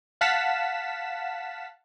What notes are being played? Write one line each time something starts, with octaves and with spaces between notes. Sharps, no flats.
F5 F#5 A5 B6 E7